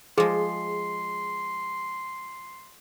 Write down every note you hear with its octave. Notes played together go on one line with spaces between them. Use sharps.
F3 G#3 G#4 C6